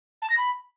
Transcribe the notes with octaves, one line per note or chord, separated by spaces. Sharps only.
A5
A#6
B5